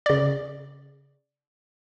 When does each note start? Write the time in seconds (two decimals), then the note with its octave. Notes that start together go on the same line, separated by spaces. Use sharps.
0.06 C#3 D5